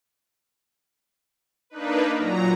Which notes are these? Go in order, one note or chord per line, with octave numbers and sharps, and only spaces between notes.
A#3 D4 D#4 B4
A#2 F#3 A#5